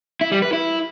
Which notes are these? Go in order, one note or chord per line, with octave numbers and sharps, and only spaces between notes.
E4
G3
B4
E4